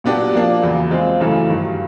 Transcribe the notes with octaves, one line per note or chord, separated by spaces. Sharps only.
A#2 F#3 B3 D4 G4
F3 A#3 D4
E2 C#3 F#3
G#3 C4 F4
F#2 C#3 E3 A3
G2 D#3 F#3